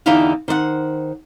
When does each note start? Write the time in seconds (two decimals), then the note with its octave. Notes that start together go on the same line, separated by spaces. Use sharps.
0.06 E2 D3 D#4 E4 G4 F5
0.48 D#3 C5 D5 F#5